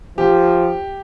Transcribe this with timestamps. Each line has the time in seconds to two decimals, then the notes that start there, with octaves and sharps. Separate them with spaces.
0.18 F3 G4